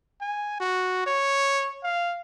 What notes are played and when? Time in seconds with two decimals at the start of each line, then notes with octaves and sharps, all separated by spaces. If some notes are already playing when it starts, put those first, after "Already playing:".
0.21 G#5
0.60 F#4
1.06 C#5
1.83 F5